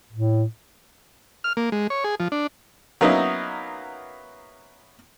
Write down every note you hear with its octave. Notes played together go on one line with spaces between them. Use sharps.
A2
F6
A#3
G#3
C#5
G#4
F3
D4
F#3 A#3 B3 C#4 D#4 E4